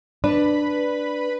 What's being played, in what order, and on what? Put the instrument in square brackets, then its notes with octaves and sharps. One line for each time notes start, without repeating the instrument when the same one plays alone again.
[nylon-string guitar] D4 [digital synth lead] B4